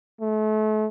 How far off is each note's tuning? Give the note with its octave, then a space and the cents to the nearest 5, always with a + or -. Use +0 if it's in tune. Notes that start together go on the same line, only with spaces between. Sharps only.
A3 -35